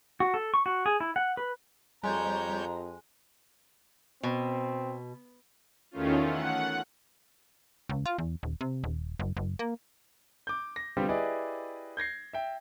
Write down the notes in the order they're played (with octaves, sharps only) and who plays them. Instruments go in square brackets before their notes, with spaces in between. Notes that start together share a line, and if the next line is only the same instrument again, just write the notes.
[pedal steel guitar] F#4
A4
C#6
F#4
G#4
E4
F#5
B4
[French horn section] F2 [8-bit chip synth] G3 C#5 G6 [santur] G#3 [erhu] A#5
[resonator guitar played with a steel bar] B2 [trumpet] C4
[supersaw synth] E2 D#3 A3 C#4 F4
F#5
[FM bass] C#2
F4
E2
D#1
C3
D#1
F#1
F#1
A#3
[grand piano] D6 G6
A#6
D3 G3 B3 C4 F4 G4
E4 G4 G#4 B4 D5 D#5
G6 G#6 A#6 C7
E5 G5